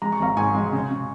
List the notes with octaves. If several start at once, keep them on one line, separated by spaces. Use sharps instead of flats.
G#3 A#5
C#6
G#1 F5 A#5
G#2 G#5 C#6
G#3
C#3
C#3